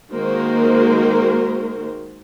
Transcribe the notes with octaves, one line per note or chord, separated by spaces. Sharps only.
D#3 G#3 A#3 F#4 A#4 C5